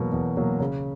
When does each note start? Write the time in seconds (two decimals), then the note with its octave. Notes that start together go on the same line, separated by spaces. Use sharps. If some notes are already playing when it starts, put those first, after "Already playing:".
Already playing: E2 B2 F#3 A#3
0.12 E2
0.37 B2 F#3 A#3
0.60 C#3